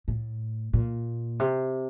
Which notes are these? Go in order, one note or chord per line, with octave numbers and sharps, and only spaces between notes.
A2
A#2
C3